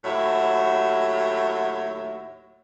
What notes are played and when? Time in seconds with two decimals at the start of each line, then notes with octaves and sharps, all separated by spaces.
0.05 D#2 A2 F#3 F#4 E5